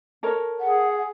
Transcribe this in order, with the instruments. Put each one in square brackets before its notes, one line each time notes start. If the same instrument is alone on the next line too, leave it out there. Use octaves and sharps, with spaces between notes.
[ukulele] A4 A#4 C#5
[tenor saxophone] G#4 [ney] F#5